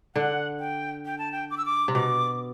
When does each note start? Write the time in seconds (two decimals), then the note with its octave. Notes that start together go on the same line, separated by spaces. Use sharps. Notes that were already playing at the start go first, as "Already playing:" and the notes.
0.15 D3 F#5
0.60 G5
1.06 G5
1.19 A5
1.32 G5
1.51 D6
1.58 E6
1.66 D6
1.88 C3
1.95 B2 D6